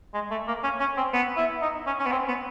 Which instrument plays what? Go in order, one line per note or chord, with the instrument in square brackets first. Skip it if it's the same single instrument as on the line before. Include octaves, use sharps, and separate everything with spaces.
[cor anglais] G#3
A3
A#3
C#4
C#4
C4
B3
E4
D#4
C#4
C#4
B3
C4
B3